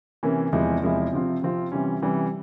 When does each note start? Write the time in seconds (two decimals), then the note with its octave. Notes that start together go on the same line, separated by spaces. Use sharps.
0.23 C3 E3 A#3 C#4
0.53 E2 C3 F3 G#3 E4
0.82 E2 C3 F3 G#3 E4
1.13 C3 F3 C4 F4
1.42 C3 F3 C4 F4
1.72 C3 E3 G3 C#4
2.02 C3 E3 G3 C#4